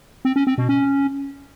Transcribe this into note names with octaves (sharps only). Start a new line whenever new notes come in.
C4
C#4
C4
B2
C#4